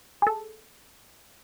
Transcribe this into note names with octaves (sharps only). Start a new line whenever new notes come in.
G#4 A4